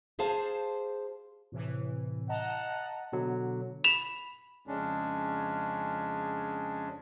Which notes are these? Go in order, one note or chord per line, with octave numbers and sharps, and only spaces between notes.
G4 G#4 C5 F5 A5
A2 C3 E3
D#5 F#5 A5 A#5
B2 D3 F#3
B5 E7 F7
F2 C#3 G#3 C#4 D4